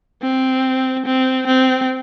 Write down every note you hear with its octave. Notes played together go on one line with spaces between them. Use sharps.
C4
C4
C4